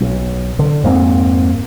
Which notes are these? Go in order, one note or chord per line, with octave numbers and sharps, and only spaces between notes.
B1
D3
F2 G#2 A#3 C4